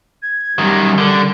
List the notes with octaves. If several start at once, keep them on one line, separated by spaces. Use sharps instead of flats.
G#6
F#2 D#3 G3
D3 A#4